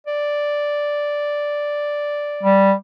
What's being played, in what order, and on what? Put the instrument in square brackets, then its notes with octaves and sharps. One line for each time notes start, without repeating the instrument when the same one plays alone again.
[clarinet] D5
[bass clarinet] G3